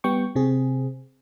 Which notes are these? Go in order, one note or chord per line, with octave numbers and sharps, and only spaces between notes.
G3 B3 G5 C#6
C3 C4 G#4